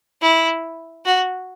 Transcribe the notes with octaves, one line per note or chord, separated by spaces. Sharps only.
E4
F#4